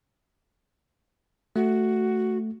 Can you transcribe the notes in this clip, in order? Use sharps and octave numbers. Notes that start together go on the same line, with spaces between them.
A3 F#4